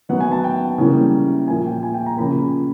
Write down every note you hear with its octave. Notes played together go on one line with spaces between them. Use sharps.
D#3 F#3 B3 F#5
G#5
A5
G5
C#3 E3 G3 A#3
A#2 F3 A#3 G#5
G5
G#5
G5
A#5
C#3 F3 A#3 B5